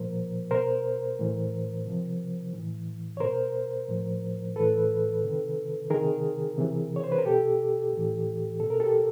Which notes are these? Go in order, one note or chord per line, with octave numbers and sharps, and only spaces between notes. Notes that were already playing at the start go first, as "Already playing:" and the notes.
Already playing: A#2 F3 A#4 C5
B2 A#4 C5
A2 E3
C3 F3
A2 E3
C#5
B2 A#4 C5
A2 F3
A2 E3 A4 B4
C3 D#3
C3 D#3 G#4 A#4
C3 E3
C#5
C5
B4
A#4
B2 G4 A4
A2 E3
B2 A4
A#4
G4 A4